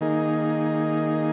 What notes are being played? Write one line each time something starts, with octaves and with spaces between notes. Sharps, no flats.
D#3 A#3 D#4 G#4